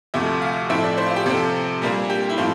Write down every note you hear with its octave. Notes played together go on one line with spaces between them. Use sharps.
D2 C3 F3 A3 E5
F5
A2 F3 A3 C4 E5
D5
C5
F4
G4
C3 F3 C4 A4
A#2 G3 A#3 D4
G4
E4
A2 F3 C4 F4